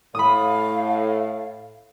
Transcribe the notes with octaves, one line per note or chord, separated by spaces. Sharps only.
A2 F5 B5 D#6